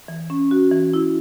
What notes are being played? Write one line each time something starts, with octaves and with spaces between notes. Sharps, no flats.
E3
C#4
F#4
E3
E4